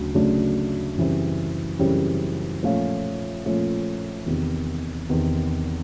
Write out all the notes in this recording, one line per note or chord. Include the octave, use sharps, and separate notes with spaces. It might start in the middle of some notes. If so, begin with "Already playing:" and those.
Already playing: D2 C#3 F#3 D4
D2 C#3 F#3 A3 D4
F#2 C#3 E3 G3 C4
F#2 C#3 E3 G3 C4
A#2 F3 A3 C#4 F4
A#2 F3 A3 C#4 F4
E2 C3 D#3
E2 C3 D#3